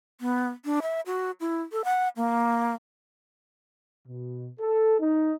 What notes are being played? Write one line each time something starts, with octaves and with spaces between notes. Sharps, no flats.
B3
D4
E5
F#4
E4
A4
F#5
A#3
B2
A4
D#4